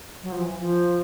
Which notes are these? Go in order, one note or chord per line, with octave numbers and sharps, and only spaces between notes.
F#3
F3
E3
F3